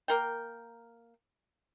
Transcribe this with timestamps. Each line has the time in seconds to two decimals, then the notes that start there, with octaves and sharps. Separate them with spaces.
0.08 A#3 A#4 G5